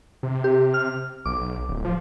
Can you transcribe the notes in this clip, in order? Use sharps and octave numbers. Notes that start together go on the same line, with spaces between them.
C3
G4
F6
B1 D6
D1
F3